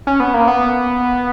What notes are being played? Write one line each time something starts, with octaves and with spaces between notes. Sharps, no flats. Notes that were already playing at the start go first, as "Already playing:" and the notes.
C#4
B3
A#3
B3